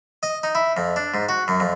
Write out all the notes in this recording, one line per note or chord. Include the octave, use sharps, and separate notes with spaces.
D#5
D#4
E4
F2
D4
G#2
F#4
F#2
F2